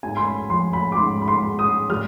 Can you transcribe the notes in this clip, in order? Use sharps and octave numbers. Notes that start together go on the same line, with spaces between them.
G#2 G#5
C6
B5
F3 C6
B5
D6
G#2 C6
B5
C6
G#3
D#6
G3 F6